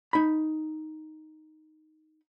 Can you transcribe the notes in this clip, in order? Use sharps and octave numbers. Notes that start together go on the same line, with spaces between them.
D#4 B5